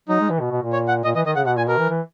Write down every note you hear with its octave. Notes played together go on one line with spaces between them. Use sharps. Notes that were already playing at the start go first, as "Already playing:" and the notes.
F#3 D#4
G#3
E3
B2
B2
A#2
C#5
F#5
A#2 D#5
E3 D#5
D#3 D#5
C#3 F#5
B2 F#5
A#2 G#5
B2 A#4
E3
E3